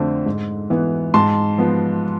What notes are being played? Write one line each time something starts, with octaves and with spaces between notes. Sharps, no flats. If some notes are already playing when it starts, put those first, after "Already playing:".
Already playing: F2 D3 A3 C4
G#2
E3 B3
G#2 A5 C6
F3 B3